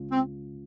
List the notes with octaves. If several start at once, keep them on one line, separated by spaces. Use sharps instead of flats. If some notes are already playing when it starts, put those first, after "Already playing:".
Already playing: C#2 C#3 G#3 C#4 F4
C4